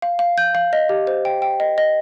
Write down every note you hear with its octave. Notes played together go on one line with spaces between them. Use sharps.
F5
F5
G6
F5
D#5
G4
C5
G5
G5
D#5
D#5